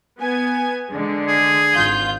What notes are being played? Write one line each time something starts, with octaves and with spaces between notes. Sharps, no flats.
B3 G#5
D3 G#3
G#4
G#1 F4 G6